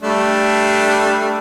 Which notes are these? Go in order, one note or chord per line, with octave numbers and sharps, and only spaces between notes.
G3 A3 D4